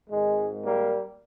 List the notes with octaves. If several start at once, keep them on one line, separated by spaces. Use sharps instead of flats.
G#1 G#2 D#3 G#3
G3 A#3